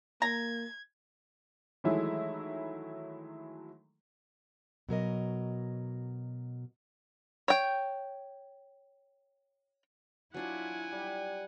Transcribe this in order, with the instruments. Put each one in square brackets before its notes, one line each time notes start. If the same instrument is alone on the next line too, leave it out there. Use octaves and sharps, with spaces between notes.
[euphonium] A#3 [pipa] A#5 [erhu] G#6
[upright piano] D#3 E3 F#3 G#3 A3 E4
[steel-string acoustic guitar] B2 F#3 A#4 D#5
[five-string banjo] C#5 G5
[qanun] F#3 D4 F4 [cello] E4 [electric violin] F#5 G#5
[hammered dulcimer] G3